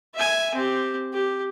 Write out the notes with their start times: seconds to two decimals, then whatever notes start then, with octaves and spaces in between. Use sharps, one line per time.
0.14 E5 G#5
0.54 C4 G4
1.13 G4